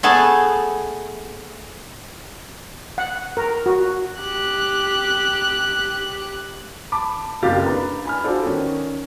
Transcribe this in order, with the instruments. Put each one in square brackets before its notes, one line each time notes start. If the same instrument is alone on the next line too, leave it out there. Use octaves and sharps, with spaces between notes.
[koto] A3 B3 G#4 A5
[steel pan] F#5
A#4
F#4
[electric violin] G4 F#6
[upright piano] A5 B5 D6
F#1 C2 A3 G4 F5 A6
D4 B4 A#5 B5
G#5 B5 F6
D4 F4 F#4 A4 C5 D5
D#3 C#4